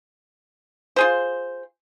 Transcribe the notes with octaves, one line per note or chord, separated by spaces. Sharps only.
F4 G#4 C5